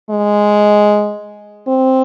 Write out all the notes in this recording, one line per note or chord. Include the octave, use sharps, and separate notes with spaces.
G#3
C4